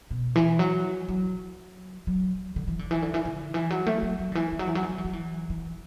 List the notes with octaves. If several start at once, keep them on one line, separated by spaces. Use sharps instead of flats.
B2
E3
F#3
F#3
F#3
D3
E3
D3
E3
D3
E3
D3
E3
F#3
A3
F#3
F#3
D3
E3
E3
F#3
E3
F#3
E3
F#3
E3
F#3
E3
E3